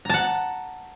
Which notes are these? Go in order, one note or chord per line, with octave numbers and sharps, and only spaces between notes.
F#5 A5 A#5